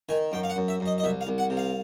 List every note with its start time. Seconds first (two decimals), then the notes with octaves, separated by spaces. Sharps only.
0.09 D#3 G#5
0.32 F#2 G5
0.43 F5
0.50 F#5
0.56 F#2
0.68 E5
0.80 F#2
0.86 D#5
0.98 D#5
1.03 C2 E5
1.21 F5
1.27 C2
1.38 F#5
1.50 C3
1.57 F5